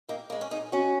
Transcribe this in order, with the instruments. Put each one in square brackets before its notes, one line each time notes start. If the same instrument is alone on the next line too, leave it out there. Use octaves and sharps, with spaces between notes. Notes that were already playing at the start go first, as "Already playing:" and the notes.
[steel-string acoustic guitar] D#2 A#3 D#4
C#3 G#3 A#3
C#4
A#2 D#4 G#4
F#3 C#4 F#4